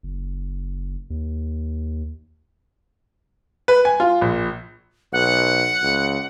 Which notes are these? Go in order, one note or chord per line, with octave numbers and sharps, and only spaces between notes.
F#1
D#2
B4
G#5
F4
A#1
B1 F#5
C#2